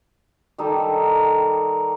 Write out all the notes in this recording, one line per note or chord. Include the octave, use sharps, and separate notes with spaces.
D#3 G3 D#4 A4